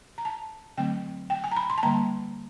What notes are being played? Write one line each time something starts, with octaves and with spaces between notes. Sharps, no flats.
A#5
A5
D3 F#3 A3 C4 G5
G5
G#5
A#5
B5
C6
A5
D3 G3 A#3 A#5